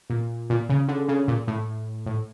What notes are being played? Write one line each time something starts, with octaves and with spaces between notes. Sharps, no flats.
A#2
A#2
C#3
D3
C#3
A#2
A2
A2